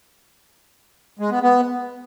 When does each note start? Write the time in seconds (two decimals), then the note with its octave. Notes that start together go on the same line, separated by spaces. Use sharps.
1.19 G#3
1.31 B3
1.42 B3